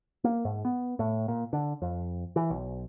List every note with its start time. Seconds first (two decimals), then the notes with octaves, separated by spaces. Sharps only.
0.24 A#3
0.45 G#2
0.65 B3
0.99 A2
1.28 A#2
1.53 D3
1.82 F2
2.36 E3
2.50 B1